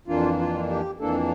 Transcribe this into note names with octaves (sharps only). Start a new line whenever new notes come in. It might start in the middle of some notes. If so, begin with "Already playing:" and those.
F2 E3 A#3 D4 F4
F4
G4
F2 E3 A#3 D4 A4